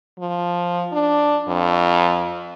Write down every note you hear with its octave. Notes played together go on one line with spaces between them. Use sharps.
F3
D4
F2